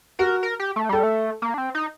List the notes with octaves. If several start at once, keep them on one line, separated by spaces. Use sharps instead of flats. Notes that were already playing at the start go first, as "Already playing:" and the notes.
F#4 A#4
A#4
G4
A3
G3 A4
A3
A#3
D4
C4
D#4